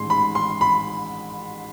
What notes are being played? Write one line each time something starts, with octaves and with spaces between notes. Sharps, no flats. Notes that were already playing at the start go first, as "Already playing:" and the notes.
Already playing: A1 G#2 D#3 G#3 C6
B5
C6
B5